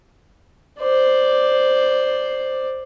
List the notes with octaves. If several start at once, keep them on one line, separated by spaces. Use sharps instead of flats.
C5 D5